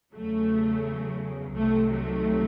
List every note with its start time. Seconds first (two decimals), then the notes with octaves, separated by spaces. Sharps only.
0.15 E2 C#3 F#3 A3
1.57 C2 C3 D#3 F#3 A3
1.92 A3